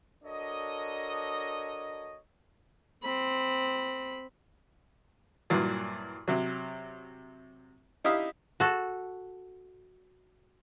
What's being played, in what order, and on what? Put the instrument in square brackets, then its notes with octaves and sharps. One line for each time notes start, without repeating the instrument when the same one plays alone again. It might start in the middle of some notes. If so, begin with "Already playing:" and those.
[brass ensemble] D4 F#4 A4 A#4 C#5 D#5
[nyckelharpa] C4 B5
[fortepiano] G2 A#2 E3 F#3
C3 F#3
D#4 E4 G4 F5 D#6
[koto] F#4 A4